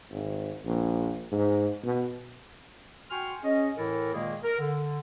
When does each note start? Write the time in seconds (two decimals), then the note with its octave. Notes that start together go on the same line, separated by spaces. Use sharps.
0.11 G#1
0.65 A#1
1.32 G#2
1.84 B2
3.10 F#4 G5 G#5 C6 C#6 F6
3.43 C#4 G#4 D#5
3.77 A2 E3 E4 A4 A#4
4.13 A#2 D#3 G#3 A#3 G#4
4.44 A#4
4.59 D3